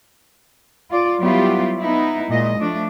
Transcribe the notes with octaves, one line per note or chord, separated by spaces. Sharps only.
F4 D5
F#3 G3 B3 E4 F4 G4
B3 D#4 E4
A#2 G#3 D#5
F3 A3 D4